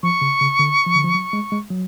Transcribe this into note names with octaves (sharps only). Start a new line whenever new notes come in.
F3 C#6
C#3
C#3
D3
F3
D3
F3
F#3
G#3
G#3
F#3